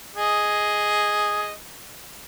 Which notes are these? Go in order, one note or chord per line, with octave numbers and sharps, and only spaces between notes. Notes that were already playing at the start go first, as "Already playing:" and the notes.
G#4 D#5